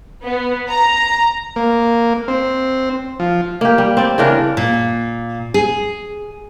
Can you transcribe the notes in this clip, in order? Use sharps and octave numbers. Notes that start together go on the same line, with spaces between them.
B3
A#5
A#3
C4
F3
A#3 G4
G3
C4 D5
C#3 E3 D4 A#4
A#2
G#4